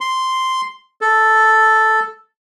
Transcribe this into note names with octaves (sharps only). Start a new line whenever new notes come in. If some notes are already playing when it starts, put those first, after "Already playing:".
C6
A4